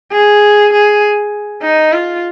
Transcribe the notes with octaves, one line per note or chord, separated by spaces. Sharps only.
G#4
G#4
D#4
F4